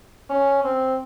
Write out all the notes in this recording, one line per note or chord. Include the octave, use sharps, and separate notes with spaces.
C#4
C4